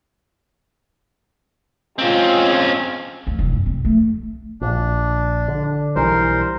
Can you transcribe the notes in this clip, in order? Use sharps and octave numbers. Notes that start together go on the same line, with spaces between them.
G#3 C4 C#4 F4
D2
F1
G2
C3
A3
A#1 D4
D3
B1 E3 G3 A#4 C5